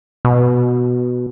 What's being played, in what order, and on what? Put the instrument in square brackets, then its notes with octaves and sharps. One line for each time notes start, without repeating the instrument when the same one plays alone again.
[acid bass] B2